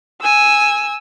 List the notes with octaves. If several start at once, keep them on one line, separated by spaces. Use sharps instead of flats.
G#5 E6